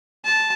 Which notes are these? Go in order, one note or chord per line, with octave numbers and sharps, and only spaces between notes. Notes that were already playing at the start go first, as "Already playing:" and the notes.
A5